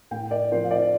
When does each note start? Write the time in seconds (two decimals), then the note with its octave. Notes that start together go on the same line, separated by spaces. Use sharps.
0.11 A2 G5
0.31 D5
0.51 F3 C4 C5
0.64 F5
0.71 D5